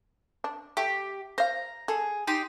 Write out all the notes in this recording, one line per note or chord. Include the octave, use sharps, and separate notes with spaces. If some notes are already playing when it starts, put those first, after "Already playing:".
D4
A3 G4
C5 F5 A#5
G#4 A4
D#4 G4 C6